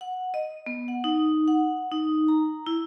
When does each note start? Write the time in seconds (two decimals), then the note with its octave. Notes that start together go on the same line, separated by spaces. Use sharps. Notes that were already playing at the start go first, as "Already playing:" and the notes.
0.01 F#5
0.34 D#5
0.66 B3
0.88 F#5
1.04 D#4
1.48 F#5
1.92 D#4
2.28 A#5
2.67 E4